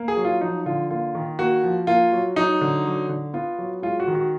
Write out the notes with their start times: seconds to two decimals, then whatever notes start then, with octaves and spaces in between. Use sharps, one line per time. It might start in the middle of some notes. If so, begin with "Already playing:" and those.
Already playing: A#3
0.08 G#4
0.17 F#3
0.25 F4
0.41 F3 D#4
0.66 D3 F4
0.90 A#3 F4
1.15 D#3
1.39 A#3 F#4
1.64 F3
1.87 A#3 F4
2.12 F#3
2.36 F#3 D#4
2.61 D3
2.86 F#3
3.09 D3
3.34 B3 F4
3.59 F#3
3.82 G#3 F4
4.00 F#4
4.07 D#3
4.15 F#4